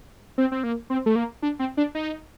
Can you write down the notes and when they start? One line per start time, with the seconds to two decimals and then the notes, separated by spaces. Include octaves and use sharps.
0.38 C4
0.52 C4
0.63 A#3
0.90 C4
1.06 A3
1.16 A#3
1.42 D4
1.59 C4
1.77 D4
1.95 D#4